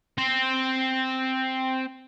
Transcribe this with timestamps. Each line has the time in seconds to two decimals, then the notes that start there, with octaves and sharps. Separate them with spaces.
0.18 C4 C5